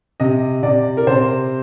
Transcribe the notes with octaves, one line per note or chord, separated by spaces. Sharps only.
C3 D#5
C3 D5
A#4
C3 C5